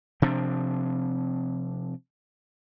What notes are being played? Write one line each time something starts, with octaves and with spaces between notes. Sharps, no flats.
C3 F3 C4 D4